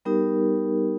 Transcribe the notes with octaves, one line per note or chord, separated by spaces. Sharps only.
G3 B3 D#4 G4 A#4